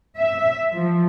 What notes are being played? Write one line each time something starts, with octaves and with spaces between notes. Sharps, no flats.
E5
F3